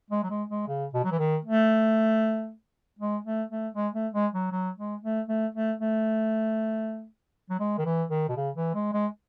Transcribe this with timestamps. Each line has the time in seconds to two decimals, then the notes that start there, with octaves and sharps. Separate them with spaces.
0.11 G#3
0.23 F#3
0.30 G#3
0.50 G#3
0.68 C#3
0.94 B2
1.04 F#3
1.11 E3
1.19 D#3
1.45 A3
2.99 G#3
3.25 A3
3.50 A3
3.75 G#3
3.94 A3
4.13 G#3
4.34 F#3
4.52 F#3
4.78 G#3
5.03 A3
5.28 A3
5.55 A3
5.81 A3
7.50 F#3
7.59 G#3
7.78 D#3
7.86 E3
8.10 D#3
8.29 B2
8.36 C#3
8.56 E3
8.74 G#3
8.93 G#3